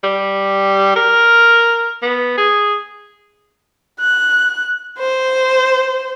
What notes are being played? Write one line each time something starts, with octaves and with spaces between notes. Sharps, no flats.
G3
A#4
B3
G#4
F#6
C5